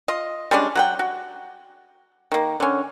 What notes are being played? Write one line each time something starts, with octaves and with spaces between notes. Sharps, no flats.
F4 D#5
G3 G#3 C#4 D4
F#3 F#5 G5
F#4
D#3 A#3
D3 C#4